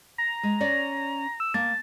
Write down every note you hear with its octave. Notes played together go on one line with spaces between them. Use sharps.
A#5
G#3
C#4 C#5 D5
E6
A#3 A5